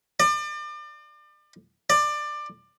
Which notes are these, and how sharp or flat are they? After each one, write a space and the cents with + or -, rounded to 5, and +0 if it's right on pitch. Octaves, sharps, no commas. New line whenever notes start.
D5 +35
D5 +20